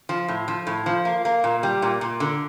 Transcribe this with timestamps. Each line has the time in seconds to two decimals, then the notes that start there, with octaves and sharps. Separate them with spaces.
0.09 F3
0.28 A2
0.48 F3
0.67 A2
0.86 F3
1.05 A#3
1.25 A#3
1.44 A#2
1.63 G3
1.82 A#2
2.01 A#2
2.20 D3